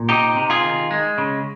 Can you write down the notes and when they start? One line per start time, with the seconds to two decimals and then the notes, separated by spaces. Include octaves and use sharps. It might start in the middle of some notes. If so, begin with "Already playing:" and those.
Already playing: A#2
0.09 C3 D#4 G4
0.36 C3
0.50 F4 G#4
0.63 D#3
0.91 G#3
1.18 C#3